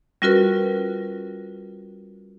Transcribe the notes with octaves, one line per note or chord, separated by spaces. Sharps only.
G3 C#4 F4 F#4 A#4 B4